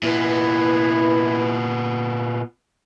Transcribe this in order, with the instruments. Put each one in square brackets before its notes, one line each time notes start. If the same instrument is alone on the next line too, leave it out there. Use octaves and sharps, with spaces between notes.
[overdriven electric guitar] A#2 B3 [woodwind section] E3 E4